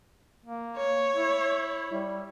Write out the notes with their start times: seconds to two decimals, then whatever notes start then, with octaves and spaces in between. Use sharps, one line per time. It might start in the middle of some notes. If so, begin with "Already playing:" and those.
0.45 A#3
0.77 C#5
1.15 E4
1.93 G3